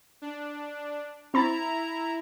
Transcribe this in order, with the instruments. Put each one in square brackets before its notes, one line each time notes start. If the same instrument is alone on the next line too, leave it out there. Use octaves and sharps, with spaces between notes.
[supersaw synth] D4
[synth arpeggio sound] C4 B5 A6 [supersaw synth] E4 [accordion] A#5